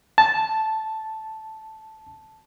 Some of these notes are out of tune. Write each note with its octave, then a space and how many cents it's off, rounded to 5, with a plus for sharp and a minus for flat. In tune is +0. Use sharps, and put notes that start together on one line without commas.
A5 -5